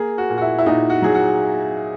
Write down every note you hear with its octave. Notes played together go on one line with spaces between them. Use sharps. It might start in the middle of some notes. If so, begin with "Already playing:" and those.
Already playing: A#3 G#4
F#4
A#2
F#4
E4
E4
A#2 D#4
F#4
F#3 G#4
F#4